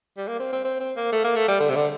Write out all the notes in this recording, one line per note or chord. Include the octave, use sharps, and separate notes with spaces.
G3
A#3
C4
C4
C4
C4
A#3
A3
A#3
A3
G3
D3
C3
D3